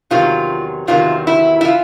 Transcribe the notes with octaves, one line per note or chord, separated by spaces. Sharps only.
E2 C3 D#3 F#3 F4
E2 C3 D#3 F#3 F4
E4
E4
E3 F4